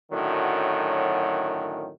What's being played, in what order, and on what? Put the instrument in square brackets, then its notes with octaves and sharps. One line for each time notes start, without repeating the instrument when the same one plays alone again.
[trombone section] F#2 A2 D3 D#3 F#3